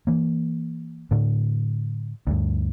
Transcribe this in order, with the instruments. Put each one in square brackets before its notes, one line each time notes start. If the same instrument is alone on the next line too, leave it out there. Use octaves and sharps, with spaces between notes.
[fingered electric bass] E3 A#3
A2 D3
D2 G2